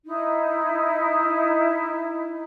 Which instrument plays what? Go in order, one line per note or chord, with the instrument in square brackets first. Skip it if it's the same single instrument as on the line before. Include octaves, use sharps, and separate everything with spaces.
[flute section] D#4 E4